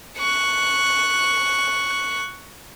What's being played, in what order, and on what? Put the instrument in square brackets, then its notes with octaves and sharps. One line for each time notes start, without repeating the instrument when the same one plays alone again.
[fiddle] C#6 F#6